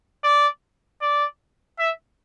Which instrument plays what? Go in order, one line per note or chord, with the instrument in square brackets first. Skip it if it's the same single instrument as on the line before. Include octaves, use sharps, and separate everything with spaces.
[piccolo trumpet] D5
D5
E5